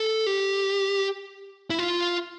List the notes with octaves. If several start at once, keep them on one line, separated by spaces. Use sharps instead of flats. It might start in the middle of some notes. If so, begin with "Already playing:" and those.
Already playing: A4
G4
E4
F4